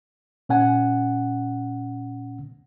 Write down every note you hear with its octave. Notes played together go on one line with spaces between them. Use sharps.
A#2 C#4 F#5 G#5